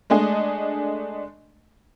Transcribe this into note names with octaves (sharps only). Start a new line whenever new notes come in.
G#3 A3 D4 D#5 G#5